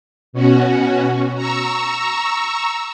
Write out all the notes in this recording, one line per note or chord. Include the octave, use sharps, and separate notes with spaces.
B2 C#4 F#4
A#5 C#6 E6